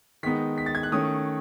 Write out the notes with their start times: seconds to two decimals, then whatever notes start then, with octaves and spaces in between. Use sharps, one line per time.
0.23 D#3 G#3 B3 D#4 B6
0.58 B6
0.66 A6
0.75 G#6
0.83 F#6
0.92 D#3 A3 C#4 D#6